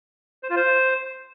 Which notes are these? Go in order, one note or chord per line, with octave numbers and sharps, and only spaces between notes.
C5
F4
C5